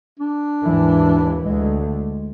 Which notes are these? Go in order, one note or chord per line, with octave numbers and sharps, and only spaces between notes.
D4
D#2 G#2 E3
D2 G#3
G#3